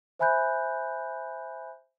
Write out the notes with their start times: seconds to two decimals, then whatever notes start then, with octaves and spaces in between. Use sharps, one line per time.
0.19 C5 E5 G#5 B5 F#6 G6